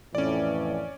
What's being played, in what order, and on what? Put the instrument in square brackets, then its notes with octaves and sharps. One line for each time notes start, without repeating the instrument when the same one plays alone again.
[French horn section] F2 A2 E3 [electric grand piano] C#4 D5